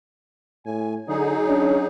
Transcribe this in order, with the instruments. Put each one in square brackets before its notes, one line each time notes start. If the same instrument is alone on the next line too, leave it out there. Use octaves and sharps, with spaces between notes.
[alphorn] A2 [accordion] G#5
[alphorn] D3 [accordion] F#3 D#4 G#4
[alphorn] C#4 [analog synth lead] D4